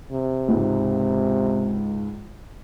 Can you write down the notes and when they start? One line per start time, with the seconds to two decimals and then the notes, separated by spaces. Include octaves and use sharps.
0.12 C3
0.48 C#2 G#2